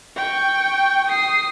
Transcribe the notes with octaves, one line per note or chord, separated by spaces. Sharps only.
G5 C#6
D#6 C7